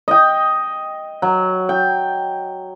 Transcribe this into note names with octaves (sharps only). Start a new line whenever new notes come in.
D#5 G5
F#3
G5